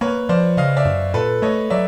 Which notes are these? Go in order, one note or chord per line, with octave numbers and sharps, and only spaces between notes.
A#3 B4 C#5
F3 C5 D5
C#3 D#5 F5
D5 E5
F#2
A#2 A4 B4
A3 C#5 D#5
F#3 D5 E5